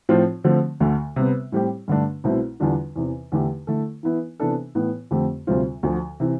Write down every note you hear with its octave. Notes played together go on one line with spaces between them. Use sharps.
A2 F3 C4 F4
D3 F3 A3 C4
D2 D3 A3
C3 G3 B3
A2 G3 C4 G4
G2 D3 A3 D4
C2 B2 A3 C4 E4
E2 D3 G3 D4 F4
E2 C3 E3
E2 D3 A3 E4 G4
D3 A3 E4 A4
E3 B3 E4
C3 E3 B3 D4 A4
A2 E3 B3
F2 D3 A3 C4 G4
D2 C3 G3 C4 F4
D2 D3 F3
C3 E3